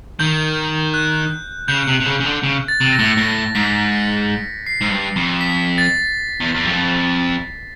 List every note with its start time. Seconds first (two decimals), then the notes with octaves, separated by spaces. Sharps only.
0.19 D#3 G6
0.94 F#6
1.68 C#3 G6
1.87 C3
2.00 C3
2.06 C#3
2.20 C#3
2.24 D3
2.43 C#3
2.68 A6
2.81 C3
2.92 A#6
2.99 A2
3.17 A2 A#6
3.55 G#2 B6
3.92 C#7
4.66 C7
4.81 G#2
4.91 G2
5.16 F2
5.41 B6
5.78 A6
6.40 E2
6.55 E2
6.65 F2